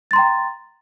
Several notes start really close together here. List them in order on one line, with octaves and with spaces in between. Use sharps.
A6 C6 A#5 G5